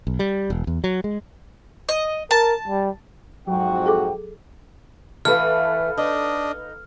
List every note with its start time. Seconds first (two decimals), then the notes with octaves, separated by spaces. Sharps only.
0.07 B1
0.19 G3
0.50 E1
0.67 E2
0.84 F#3
1.04 G#3
1.89 D#5
2.31 A#4 A5
2.68 G3
3.47 F2 G#2 F#3 F#4 G5
3.86 G#4 A4 D6
5.25 E3 A3 A4 B4 F5 F6
5.97 D4 D#4 D#5